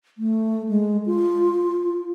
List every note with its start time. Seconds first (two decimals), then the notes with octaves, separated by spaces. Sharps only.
0.18 A3
0.69 G#3
1.06 F4